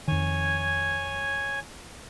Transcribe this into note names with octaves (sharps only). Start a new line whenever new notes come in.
F2 D#3 C#5 G#5